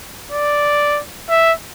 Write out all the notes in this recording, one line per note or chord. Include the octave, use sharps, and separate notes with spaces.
D5
E5